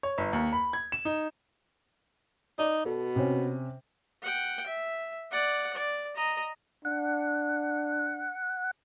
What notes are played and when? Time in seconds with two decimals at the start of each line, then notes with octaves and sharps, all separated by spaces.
0.03 C#5
0.18 G1
0.33 D#2
0.53 B5
0.73 G#6
0.92 E7
1.05 D#4
2.59 D#4 D5
2.85 B2 A4
3.16 C3 C#4
4.23 F#5 G5
4.67 E5
5.32 D5 F#5
5.74 D5
6.16 D#5 A#5
6.85 D4 F#5